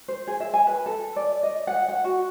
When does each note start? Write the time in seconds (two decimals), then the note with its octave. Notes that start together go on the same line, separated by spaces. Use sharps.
0.08 C5
0.27 G#4
0.40 E5
0.54 G#5
0.67 B4
0.86 A4
1.16 D5
1.43 D#5
1.67 F#5
1.89 F#5
2.04 F#4